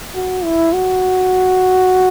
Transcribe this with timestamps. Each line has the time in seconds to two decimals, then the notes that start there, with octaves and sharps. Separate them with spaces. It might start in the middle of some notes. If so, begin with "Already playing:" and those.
0.15 F#4
0.44 E4
0.73 F#4